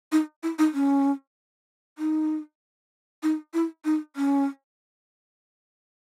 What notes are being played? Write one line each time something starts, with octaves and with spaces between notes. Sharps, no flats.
D#4
E4
D#4
C#4
D#4
D#4
E4
D#4
C#4